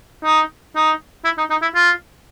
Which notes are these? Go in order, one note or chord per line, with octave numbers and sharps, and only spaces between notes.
D#4
D#4
E4
D#4
D#4
E4
F4